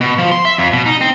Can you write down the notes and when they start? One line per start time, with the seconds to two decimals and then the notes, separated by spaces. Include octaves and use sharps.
0.01 B2
0.18 F3
0.32 C6
0.45 E5
0.58 F2
0.73 B2
0.86 D#4
1.01 C4